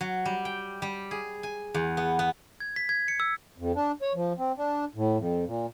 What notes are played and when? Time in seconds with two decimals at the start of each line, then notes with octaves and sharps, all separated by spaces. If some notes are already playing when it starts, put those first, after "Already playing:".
0.01 F#3
0.25 G3
0.45 G5
0.82 G3
1.11 G#4
1.43 G#5
1.74 E2
1.97 B3
2.19 B3
2.60 G#6
2.76 B6
2.89 G#6
3.08 C#7
3.20 E6
3.58 F2
3.75 D4
4.02 C#5
4.15 F3
4.38 C4
4.58 D4
4.95 A2
5.18 F2
5.47 A#2